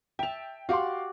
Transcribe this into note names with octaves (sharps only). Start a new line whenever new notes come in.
E5 G5 A5 F7
F#4 G4 D5 F5 C6